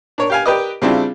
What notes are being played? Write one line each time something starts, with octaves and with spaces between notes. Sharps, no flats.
D4 A#4 C#5
G4 F5 G#5
G4 A#4 B4 D5 D#5
C#3 G3 C4 D4 E4 F4